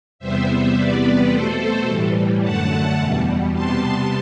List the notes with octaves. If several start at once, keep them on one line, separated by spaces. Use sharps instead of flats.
E2 C3 G3 B3 C5 E5
E2 C3 G3 B3 B4 D5
B2 A3 A4 C5
A2 E3 G3
F#2 D3 A3 F#5 A5
E2 B2 G3
C3 G3 B3 A5 C6